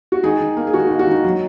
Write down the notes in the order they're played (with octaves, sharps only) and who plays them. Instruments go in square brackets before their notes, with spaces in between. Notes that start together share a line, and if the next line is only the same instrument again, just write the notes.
[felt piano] F#4
D#3 D#4 G#4
D#3
A#3
G#4
D#3 F#4
A#3 D#4
F#4
D#3 D#4
F#3 D#4